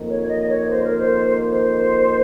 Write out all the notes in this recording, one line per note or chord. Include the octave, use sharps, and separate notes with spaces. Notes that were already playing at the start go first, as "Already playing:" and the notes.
Already playing: F2 D#3 A#3
C#5
D#5
C#5
C5
A#4
C5
C5